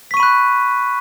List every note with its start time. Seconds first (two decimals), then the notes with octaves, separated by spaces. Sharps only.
0.11 B6
0.14 C#6
0.17 D#7
0.20 B5
0.23 F#6